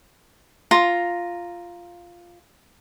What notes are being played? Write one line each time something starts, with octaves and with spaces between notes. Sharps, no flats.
F4 A#5